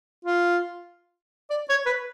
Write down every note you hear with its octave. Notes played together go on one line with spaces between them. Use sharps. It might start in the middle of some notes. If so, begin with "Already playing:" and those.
F4
D5
C#5
B4